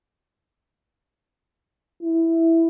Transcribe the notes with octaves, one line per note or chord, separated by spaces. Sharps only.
E4